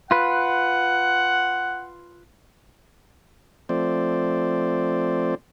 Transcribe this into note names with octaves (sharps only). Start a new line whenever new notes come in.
F4 B4 F#5
F3 A3 C4 C5 D5